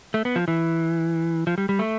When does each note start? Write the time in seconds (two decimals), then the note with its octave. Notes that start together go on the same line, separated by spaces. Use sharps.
0.14 A3
0.25 B3
0.36 F3
0.48 E3
1.47 F3
1.58 G3
1.69 G3
1.79 A3